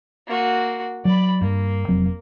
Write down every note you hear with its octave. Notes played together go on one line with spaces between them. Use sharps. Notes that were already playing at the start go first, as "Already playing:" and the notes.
A#3 F#4
F#3 D5 B5
G2 A#3
F1 F#3 C4